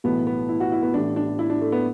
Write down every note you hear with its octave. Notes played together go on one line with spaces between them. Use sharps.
B1 A2 E3 B3
B3
E4
F#4
E4
B3
A1 A2 E3 D4
D4
E4
D4
A3
B3